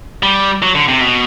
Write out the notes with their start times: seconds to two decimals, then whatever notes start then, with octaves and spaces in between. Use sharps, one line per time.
0.23 G3
0.62 F#3
0.75 D3
0.88 C3
1.01 B2